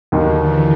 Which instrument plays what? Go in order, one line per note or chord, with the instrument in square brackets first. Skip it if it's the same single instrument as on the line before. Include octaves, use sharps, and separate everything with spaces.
[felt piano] D#2 D#3 F#3 [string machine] D3
[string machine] D3 E3